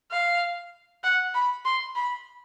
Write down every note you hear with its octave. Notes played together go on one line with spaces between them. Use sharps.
F5
F#5
B5
C6
B5